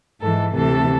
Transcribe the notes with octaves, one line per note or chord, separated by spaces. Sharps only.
G#2 E3 A4
D2 C3 E3 A4